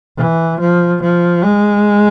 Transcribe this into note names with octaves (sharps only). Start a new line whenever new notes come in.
E3
F3
F3
G#3